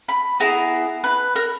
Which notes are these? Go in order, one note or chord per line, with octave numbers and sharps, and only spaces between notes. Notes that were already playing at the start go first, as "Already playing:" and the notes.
B5
B3 E4 G#4 A#5
B4
A#4